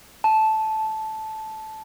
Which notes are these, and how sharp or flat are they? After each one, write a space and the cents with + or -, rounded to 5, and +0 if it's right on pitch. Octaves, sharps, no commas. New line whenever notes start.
A5 -10